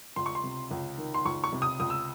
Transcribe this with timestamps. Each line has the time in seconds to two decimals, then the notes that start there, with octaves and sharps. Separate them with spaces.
0.16 C#2 C6
0.26 C#6
0.35 C6
0.44 C3
0.71 C#2
0.98 D#3
1.14 C6
1.25 C#2 C#6
1.44 C#6
1.52 C3
1.62 D#6
1.80 C#2 D#6
1.90 E6